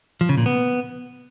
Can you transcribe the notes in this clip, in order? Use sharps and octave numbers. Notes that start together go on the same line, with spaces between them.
F3
C#3
A#2
B3